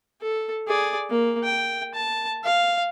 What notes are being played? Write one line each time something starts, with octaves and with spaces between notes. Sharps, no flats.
A4
G#4 D5
A#3
G5
A5
F5